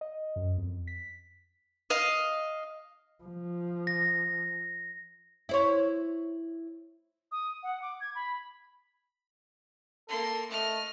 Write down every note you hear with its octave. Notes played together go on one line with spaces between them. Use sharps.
D#5
F#2
F2
B6
D#5 F5
F3
A#6
E4 C5 C#5
D#6
F#5
D6
G#6
B5
A#3 A4 C6
A3 D#5 F6